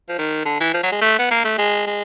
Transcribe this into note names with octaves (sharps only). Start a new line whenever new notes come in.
F3
D#3
D3
E3
F3
F#3
G#3
A3
B3
A#3
A3
G#3
G#3